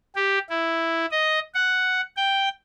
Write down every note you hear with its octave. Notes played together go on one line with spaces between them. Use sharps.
G4
E4
D#5
F#5
G5